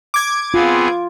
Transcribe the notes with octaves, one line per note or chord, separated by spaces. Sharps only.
D6 G#6
B3 C4 F4 G#4